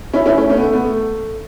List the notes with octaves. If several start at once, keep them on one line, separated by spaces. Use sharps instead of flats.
C#4 E4
C#4 E4
A3 C#4
A3 C#4
B3
A3
B3
A3